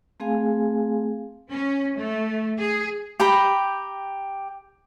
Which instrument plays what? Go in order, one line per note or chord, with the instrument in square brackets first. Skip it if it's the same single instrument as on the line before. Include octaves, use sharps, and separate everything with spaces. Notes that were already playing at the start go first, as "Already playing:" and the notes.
[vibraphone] A3 C4 G#4 F5 G#5
[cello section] C#4
A3
G#4
[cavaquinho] G4 G5 A#5 B5